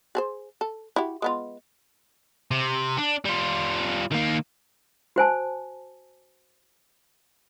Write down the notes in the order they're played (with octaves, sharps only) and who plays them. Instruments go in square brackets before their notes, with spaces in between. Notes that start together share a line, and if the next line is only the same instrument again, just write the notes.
[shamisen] G#4 A4 C5
A4
E4 F#4 G4
G#3 B3 F4
[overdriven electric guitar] C3
D4
G3 F4
D#3 A#3
[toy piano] F#4 C5 G#5 A5